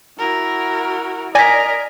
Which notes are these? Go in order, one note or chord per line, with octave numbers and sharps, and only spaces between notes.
E4 F#4 A#4
A#4 D5 D#5 G#5 A#6 B6